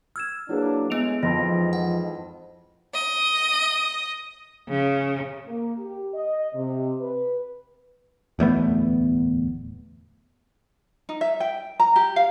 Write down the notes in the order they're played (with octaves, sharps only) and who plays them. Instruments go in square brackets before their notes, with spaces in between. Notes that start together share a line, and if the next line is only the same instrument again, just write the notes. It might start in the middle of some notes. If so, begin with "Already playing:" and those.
[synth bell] E6 [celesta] F6 G#6 E7
[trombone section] F#3 A#3 D4 [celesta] E4 G#4 B4
[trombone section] G#3 A3 [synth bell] B3 D7 F7
[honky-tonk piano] F2 [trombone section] G#2 E3 F3 [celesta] A5 C6 A#6
[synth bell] F#5
[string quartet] D#5
C#3
[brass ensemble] A#3
G4
D#5
C3
B4
[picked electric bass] D1 E2 A3 B3
[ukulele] D#4
E5
G5
A#5
G4
F5